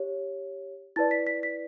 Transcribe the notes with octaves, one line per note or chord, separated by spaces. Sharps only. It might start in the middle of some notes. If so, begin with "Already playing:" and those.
Already playing: G4 C#5
E4 B4 D5 A5 A6
B6
B6
B6